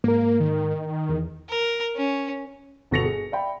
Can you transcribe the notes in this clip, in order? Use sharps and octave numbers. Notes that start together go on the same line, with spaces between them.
G#2 A#3 A#4
D#3
E2
A#4
C#4
G1 B2 A4 A#6 C#7 F7
G#4
D5 E5 G5 B5